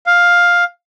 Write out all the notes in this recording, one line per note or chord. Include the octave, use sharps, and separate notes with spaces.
F5